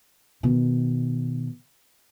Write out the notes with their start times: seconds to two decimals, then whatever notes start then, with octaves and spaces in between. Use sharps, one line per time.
0.43 B2 D#3